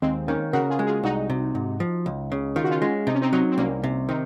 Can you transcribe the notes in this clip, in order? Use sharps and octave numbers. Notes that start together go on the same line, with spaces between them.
D#2 G#3 C4
D#3 A#3 C#4
C#3 F#4 A#4
F4 G#4
G#3
F4 G#4
C2 D#4 F#4
C3
G#2
F3
C#2
C#3
D#3 F4
F#4
C#4 F4
G#3 C#4 F4
C3 D#4
C#4
C4 D#4
F#3 C4 D#4
C4
C2 A#3 C#4
C3
D#3 C4 D#4